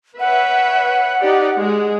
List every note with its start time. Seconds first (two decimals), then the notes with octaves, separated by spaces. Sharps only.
0.20 B4 C#5 E5 F#5
1.20 D#4 G4 D5
1.57 G#3 G#4